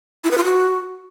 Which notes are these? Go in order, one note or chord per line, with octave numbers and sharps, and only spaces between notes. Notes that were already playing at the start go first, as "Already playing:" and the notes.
E4
B4
F4
F#4